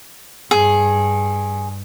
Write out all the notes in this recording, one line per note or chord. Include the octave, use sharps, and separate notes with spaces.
G2 G#4